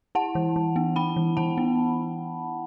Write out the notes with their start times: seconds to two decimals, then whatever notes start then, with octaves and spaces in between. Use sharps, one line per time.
0.15 E4 F#5 A5
0.35 E3
0.56 E3
0.76 B3
0.96 B3 G5 B5
1.16 E3
1.37 E3 F#5 A5
1.58 B3